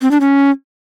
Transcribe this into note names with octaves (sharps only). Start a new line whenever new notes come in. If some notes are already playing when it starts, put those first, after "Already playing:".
C4
D4
C#4